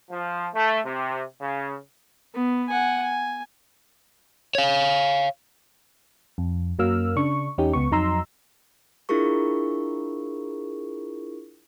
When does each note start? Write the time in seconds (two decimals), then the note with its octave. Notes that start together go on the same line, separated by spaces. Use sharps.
0.11 F3
0.55 A3
0.86 C3
1.41 C#3
2.34 B3
2.69 F#5 G#5
3.02 G#5
4.55 C#5 F5
6.38 F2
6.79 F#2 F#3 A#3 E6 F6
7.16 C#3 D4 C#6
7.58 E2 C#4 D#4 G4
7.73 C#2 B3 C#6
7.91 F2 F#3 D#4 A#5 C6 E6
9.09 D4 E4 F4 G#4 A#4 C#6